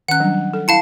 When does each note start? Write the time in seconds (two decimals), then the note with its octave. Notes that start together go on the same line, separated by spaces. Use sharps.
0.08 D#3 C#4 F#5 F#6
0.20 F#3 G3 D4
0.54 A4
0.68 E4 F5 A5 B5 C#7